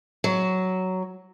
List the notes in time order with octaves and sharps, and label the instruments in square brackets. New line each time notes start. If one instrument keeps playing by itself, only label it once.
[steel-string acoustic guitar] F#3